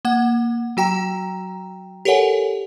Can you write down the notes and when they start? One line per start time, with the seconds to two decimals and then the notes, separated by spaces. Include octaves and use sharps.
0.05 A#3 F#5
0.77 F#3 F#4 G5 A#5
2.05 G4 A4 A#4 C#5 F#5 G#5